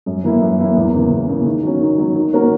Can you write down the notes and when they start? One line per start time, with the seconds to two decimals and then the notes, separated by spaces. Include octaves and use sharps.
0.06 F#2
0.24 E3 A#3 E4
0.42 F#2
0.59 E3 A#3 E4
0.76 E2
0.94 C#3 E3 A#3
1.11 E2
1.28 C#3 E3 A#3
1.46 D#3
1.63 F#3 C#4
1.81 D#3
1.98 F#3 C#4
2.16 D#3
2.33 A#3 C#4 F#4 A#4